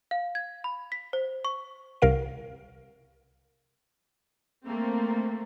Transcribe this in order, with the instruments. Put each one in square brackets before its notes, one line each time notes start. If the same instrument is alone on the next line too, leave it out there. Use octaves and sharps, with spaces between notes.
[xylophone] F5
G#6
B5
B6
C5
C#6
[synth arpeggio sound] C2 C3 A#4 F5 D7
[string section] A3 A#3 C4